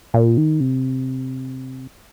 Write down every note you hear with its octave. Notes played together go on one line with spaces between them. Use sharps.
A#2
D#3
C3